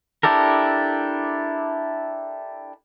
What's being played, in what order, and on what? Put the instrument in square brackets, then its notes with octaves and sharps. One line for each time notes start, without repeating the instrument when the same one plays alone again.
[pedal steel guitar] D4 E4 G4 A4 A#4